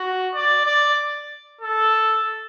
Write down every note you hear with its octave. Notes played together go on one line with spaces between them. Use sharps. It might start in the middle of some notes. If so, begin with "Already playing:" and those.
Already playing: F#4
D5
D5
A4